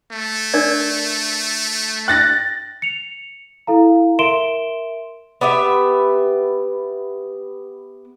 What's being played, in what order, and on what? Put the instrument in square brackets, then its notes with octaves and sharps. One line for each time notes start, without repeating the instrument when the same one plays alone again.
[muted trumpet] A3
[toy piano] D4 A#4 D5
[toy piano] G5 [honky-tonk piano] F#6 A6 A#6
[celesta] C#7 F7
E4 A4 F5 A#5
A#4 E5 C6 D7 E7 G7
[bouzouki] B3 G4 B4 E5